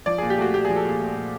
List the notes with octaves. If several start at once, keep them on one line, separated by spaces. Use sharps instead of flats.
F3 D5
A#2 G#4
G4
A3 F#4
A#2 G4
F3 G#4
A4
A#2 G#4
A3
A#2